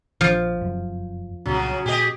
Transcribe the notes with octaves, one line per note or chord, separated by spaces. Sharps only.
A#1 F3
F1 F#2
C2 A#2 C#3 F#3 D4
A#2 G4 G#4 D#5